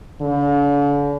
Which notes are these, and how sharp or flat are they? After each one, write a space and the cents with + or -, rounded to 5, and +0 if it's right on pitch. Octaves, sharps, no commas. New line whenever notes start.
D3 -45